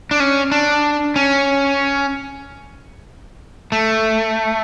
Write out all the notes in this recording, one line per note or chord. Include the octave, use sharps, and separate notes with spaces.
D4
C#4
D4
C#4
A3